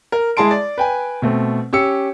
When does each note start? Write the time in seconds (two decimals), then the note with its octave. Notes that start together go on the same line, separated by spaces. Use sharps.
0.12 A#4
0.37 G#3 E4 G#4 A5 C6 D7
0.51 D5
0.78 B4 G5 G#5
1.22 B2 A3 C4
1.73 C#4 G4 E6 C#7